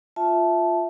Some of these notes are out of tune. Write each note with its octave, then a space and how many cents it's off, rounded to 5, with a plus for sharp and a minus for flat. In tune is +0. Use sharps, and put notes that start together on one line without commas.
F4 +0 E5 +0 A5 -15